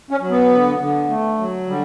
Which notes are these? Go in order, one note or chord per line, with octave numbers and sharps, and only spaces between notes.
C#4
F#3
B3
D3
D3
A3
F#3
D3 G3